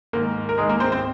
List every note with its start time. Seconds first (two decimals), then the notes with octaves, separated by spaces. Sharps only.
0.13 G#2 D#3 A#3 A#4
0.49 A#4
0.58 G#2 D#3 G#3 G#4
0.69 A#3 A#4
0.80 C4 C5
0.92 C4 C5